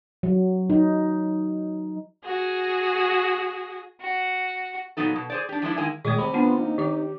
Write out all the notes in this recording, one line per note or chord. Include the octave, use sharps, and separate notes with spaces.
F#3
D#4
F#4 G#4 A#6
F#4
A#2 D3 F#3 B3 D#4 A4
B2
G#4 C5 D5
D4 G4
F3 G#3 D4 E4
D#3 G#3 A#3 E4 G#5
A#2 D#3 G#3 A3 D#6
C3 B5
B3 D4 F4 F#5 A5
A#3 D#4
D#3 G4 D6